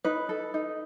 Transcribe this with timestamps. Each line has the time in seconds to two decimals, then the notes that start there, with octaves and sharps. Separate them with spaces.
0.04 D#4 B4
0.29 A4
0.54 D#4